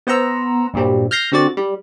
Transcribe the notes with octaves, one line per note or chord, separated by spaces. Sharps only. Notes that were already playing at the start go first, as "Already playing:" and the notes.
B3 C5 F#5 A#5 E6
G2 A#2 F#3 G3 C4
F6 G6 A#6 C7
D3 C4 F#4 D5 A6
G3